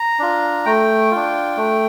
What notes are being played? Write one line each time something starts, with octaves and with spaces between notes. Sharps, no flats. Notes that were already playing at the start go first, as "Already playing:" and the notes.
Already playing: A#5
D4 F4
A3 G5
D4 F4
A3